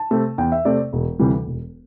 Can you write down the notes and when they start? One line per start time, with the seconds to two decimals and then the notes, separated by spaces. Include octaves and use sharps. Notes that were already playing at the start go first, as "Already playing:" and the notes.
Already playing: A5
0.11 C3 A3 C4
0.38 E2 G5
0.52 E5
0.65 C3 A3 C4 D5
0.93 E1
1.19 D2 C3 E3 G3
1.47 E1